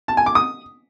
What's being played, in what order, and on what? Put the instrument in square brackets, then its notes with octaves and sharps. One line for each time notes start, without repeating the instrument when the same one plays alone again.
[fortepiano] A5
G#5
D6
D#6